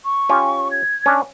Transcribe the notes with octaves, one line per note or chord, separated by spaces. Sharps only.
C#6
C#4 F4 G4
G#6
C#4 D4